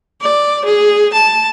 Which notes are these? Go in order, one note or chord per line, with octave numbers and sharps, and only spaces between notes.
D5
G#4
A5